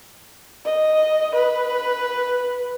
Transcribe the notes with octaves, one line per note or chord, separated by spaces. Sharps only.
D#5
B4